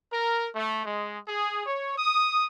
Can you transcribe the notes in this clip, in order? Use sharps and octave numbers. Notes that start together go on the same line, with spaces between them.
A#4
A3
G#3
G#4
C#5
D#6